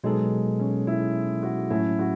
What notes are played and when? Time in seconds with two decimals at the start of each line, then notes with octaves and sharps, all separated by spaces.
0.04 B2 F#3 G#3 B3 D#4 A4
0.59 C#4
0.87 E4
1.43 F#4
1.70 A2 F#3 A3 C#4 E4
1.99 F#4